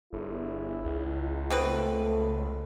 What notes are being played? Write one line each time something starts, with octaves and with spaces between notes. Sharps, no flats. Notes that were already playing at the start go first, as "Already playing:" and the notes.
G1 E4 G#4
C#2
B2 A3 C4 B4